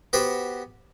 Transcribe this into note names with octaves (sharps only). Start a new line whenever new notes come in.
B3 F#4 G4 B4 C5